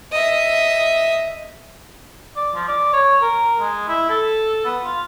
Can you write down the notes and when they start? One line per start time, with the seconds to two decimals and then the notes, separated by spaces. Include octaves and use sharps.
0.12 D#5 E5
2.36 D5
2.55 F3
2.68 D5
2.93 C#5
3.21 A#4
3.59 G#3
3.88 E4
4.09 A4
4.65 B3
4.84 F4